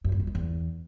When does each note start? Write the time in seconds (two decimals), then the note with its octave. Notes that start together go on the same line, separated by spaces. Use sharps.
0.04 F#2
0.12 G2
0.20 F2
0.27 F#2
0.35 E2